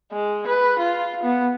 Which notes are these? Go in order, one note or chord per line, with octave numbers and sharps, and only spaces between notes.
G#3
B4
F4
B3